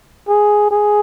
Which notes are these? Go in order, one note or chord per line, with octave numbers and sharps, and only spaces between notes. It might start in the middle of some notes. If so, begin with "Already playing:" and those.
G#4
G#4